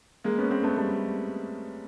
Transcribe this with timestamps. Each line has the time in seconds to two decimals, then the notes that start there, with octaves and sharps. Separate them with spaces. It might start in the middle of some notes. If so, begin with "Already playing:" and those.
0.24 G#3 A#3
0.38 B3 C#4
0.50 A#3 C4
0.63 A3 B3
0.77 G3 A3